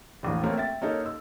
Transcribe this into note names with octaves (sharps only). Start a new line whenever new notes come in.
E1 A#1 A2
A3 A#3 C4 C#4
E5 G5 A6
A#3 C#4 D#4 A4
E6